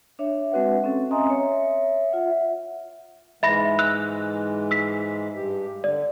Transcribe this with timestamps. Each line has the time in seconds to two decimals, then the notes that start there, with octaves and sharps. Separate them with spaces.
0.19 D4 C#5 E5
0.52 G#3 C4 F#4 B4 F#5
0.84 C4 C#4 A4
1.11 D#5 E5 G#5 A#5 C6 D#6
1.29 C#5 E5
2.12 F4 E5 F#5
3.43 G#2 E3 G#3 E5 B5 A#6
3.79 E6 F#6 F7
4.71 E6 B6 C7
5.36 G2 G4
5.84 D3 D5